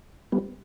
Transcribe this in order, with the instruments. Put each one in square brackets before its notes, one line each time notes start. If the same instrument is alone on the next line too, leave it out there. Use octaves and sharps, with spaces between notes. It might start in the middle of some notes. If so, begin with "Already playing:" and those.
[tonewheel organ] G3 B3